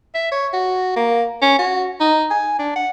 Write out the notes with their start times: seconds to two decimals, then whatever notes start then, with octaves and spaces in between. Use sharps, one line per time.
0.15 E5
0.32 C#5
0.53 F#4
0.96 A#3
1.42 C#4
1.59 F#4
2.00 D#4
2.31 G#5
2.59 D4
2.76 F#5